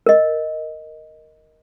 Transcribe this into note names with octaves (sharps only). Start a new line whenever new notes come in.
A#4 D#5